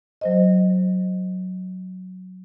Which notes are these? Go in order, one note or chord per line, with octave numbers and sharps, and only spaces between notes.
F#3 C5 D#5